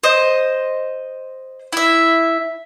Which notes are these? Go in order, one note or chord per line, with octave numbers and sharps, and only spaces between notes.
C5 D#5
E4 E5